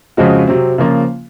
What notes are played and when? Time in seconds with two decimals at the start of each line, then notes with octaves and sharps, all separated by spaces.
0.17 F2 C#3 G#3 C4 F#4
0.48 C3 F#3 C4
0.78 C#3 F3 A#3 F4